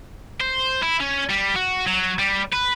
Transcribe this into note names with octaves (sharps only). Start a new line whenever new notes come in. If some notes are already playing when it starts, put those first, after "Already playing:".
C5
E4
C#4
G3
F#4
F#3
G3
B4